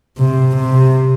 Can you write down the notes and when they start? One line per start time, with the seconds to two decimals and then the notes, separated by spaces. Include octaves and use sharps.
0.18 C3
0.57 C3